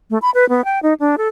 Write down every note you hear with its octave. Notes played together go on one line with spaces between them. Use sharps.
A3
B5
B4
B3
G5
D#4
D4
A4